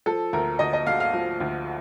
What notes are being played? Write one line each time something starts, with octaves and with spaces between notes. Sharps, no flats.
F3 A4
D2 A#4
D2 D#5
D#5
D3 F5
F5
F3
D2